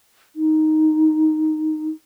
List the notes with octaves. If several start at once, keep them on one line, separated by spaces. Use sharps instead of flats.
D#4